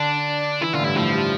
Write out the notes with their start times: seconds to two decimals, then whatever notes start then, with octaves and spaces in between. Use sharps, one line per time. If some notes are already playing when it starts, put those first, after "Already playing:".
Already playing: D3 D4
0.61 E3 E4
0.73 D3 F4
0.79 A2
0.84 G2 E4
0.96 A2 F3
1.13 G3